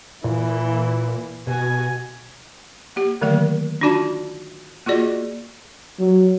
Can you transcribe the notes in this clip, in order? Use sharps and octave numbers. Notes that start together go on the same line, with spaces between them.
A#2 E3
B2 F#4 G#5
A#3 G4
D3 D#3 F#3 A3 A#3 A#4
D4 D#4 F4 F#4 D5 A5
A#3 F4 F#4 G#4 D5 D#5
F#3